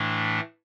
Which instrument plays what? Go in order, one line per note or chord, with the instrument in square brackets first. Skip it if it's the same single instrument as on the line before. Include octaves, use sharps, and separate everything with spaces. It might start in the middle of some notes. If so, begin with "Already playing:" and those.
Already playing: [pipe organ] A2 E3 A3 D4